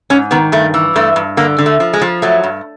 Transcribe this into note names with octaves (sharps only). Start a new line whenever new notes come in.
G#2 C#4
D#3 B3
G2 A3
E3
G2 A3
G2
D3 A#3
D3
A3
F3
G#3
F3
F#3 A3
G2